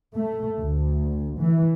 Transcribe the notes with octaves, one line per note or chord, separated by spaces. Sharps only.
A3
D2
E3